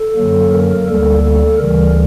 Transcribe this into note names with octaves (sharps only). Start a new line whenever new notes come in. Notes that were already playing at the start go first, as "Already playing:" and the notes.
Already playing: A4
F#2 D3 F#3 A#3
A#4
D2 D3 G3 A#3 A4
A4
D2 C#3 E3 G3 A#4